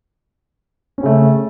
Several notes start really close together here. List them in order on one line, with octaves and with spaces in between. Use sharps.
C#4 C4 C#3 A3